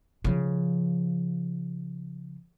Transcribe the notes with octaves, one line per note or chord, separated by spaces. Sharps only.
C#3 F3